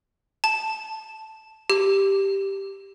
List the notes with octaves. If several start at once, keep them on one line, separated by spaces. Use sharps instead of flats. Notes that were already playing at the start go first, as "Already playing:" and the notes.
A5
G4